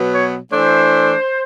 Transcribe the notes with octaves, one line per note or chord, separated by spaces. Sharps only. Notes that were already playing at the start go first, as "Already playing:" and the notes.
Already playing: B2 F#3 B3
C#5
E3 A3 D4 C5